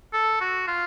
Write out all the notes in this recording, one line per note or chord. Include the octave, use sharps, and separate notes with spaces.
A4
F#4
F4